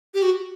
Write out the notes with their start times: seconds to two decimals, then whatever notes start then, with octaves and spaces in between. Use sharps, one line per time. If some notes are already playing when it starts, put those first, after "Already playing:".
0.14 G4
0.22 F#4